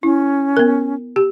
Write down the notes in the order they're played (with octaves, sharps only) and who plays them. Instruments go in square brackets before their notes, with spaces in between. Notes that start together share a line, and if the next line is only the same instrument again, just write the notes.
[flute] C#4 [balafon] E4
[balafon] B3 A#4
G4